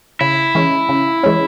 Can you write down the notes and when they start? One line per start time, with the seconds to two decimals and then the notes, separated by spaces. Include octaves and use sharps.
0.21 C#3 E4
0.55 E3 G#3 C#4
0.89 C#3
1.23 E3 G#3 C#4